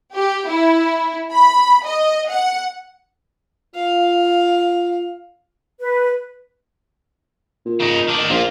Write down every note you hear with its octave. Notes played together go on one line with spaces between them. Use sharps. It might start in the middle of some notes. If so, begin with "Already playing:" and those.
G4
E4
B5
D#5
F#5
F4 F5
B4
A#2
C#3 D#4
D#3 D4
A#1 A#3 F4